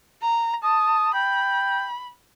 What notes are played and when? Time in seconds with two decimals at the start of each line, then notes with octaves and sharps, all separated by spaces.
0.22 A#5
0.64 A5 D#6
1.14 G5 B5